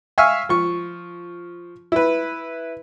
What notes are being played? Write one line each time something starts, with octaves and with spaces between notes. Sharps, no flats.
E5 F5 G#5 C#6 E6 F6
F3 C#6
E4 B4